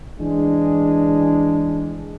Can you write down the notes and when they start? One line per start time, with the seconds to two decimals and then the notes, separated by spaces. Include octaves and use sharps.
0.20 E3 G#3 D4